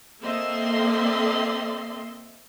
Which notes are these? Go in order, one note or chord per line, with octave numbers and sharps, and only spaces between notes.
A#3 C4 A4 D#5 E5 C6